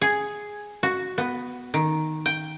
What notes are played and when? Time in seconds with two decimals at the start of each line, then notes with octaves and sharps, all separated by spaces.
0.01 G#4
0.83 F#4
1.18 B3
1.74 D#3
2.26 G5